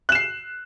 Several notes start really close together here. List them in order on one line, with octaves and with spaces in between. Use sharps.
F#6 E7 C7